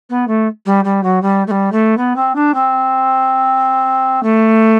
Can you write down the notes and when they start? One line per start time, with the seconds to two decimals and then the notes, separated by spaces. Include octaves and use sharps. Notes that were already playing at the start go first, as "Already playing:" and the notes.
0.10 B3
0.28 A3
0.66 G3
0.85 G3
1.03 F#3
1.22 G3
1.47 A3
1.51 G3
1.72 A3
1.97 B3
2.16 C4
2.35 D4
2.54 C4
4.23 A3